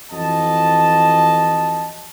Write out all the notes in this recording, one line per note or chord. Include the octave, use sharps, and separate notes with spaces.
F2 E3 F#4 D#5 A5